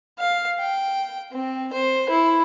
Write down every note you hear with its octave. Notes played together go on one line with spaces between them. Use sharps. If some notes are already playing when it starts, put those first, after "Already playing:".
F5
G5
C4
C5
E4